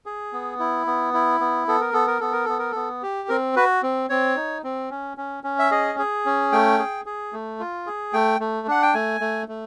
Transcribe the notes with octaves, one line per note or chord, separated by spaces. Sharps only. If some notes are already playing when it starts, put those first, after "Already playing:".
G#4
B3
E4
B3
E4
B3
B3 A4
A#4
B3 A4
A#4
B3 A4
A#4
B3 A4
A#4
B3 A4
G4
C4 A#4
F#4 B4
C4
C4 C#5
D#4
C4
C#4
C#4
C#4
E5
G#4 D#5
G#4
C#4
A3 G5
G#4
G#4
A3
F4
G#4
A3 G5
A3
D4 F#5
G5
A3 G#5
A3
A3